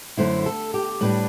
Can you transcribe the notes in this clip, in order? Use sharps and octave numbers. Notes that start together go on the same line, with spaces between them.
F#2 D3 A3 E4 C5
A4
G4
A2 G3 D4 B4